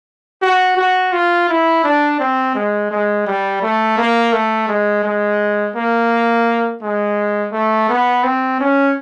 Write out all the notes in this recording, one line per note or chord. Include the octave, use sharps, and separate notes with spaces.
F#4
F#4
F4
E4
D4
C4
G#3
G#3
G3
A3
A#3
A3
G#3
G#3
A#3
G#3
A3
B3
C4
C#4